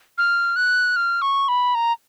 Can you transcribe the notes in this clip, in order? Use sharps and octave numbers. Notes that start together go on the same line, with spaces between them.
F6
F#6
F6
C#6
B5
A#5